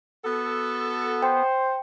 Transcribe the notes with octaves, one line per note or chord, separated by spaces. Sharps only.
B3 F#4 A4
C5 G5